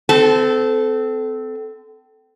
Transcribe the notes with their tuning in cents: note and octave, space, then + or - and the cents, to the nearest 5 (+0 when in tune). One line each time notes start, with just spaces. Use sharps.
C4 -35 A4 -15